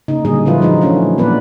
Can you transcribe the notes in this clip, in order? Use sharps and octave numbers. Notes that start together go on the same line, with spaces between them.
C#3 A#3 D#4
A#2 D3 F#3 G3 G#4 D#5
D3 F3 F#3 E4 F4 B4
D3 F3 G#3 D#4
E3 F#3 A3 C#4
A#2 B3 D4 B4 D5